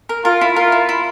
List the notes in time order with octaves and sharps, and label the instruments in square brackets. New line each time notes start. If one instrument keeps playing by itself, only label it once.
[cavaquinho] A#4
[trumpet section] F4 [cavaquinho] A#4
[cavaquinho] E4
[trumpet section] F4 [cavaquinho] A#4
[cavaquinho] E4
E4